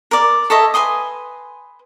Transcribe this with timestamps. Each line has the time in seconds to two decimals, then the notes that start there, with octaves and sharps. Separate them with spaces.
0.11 A#4 D5
0.50 A4 C#5 D#5 E5
0.74 B4 G#5 C6 D#6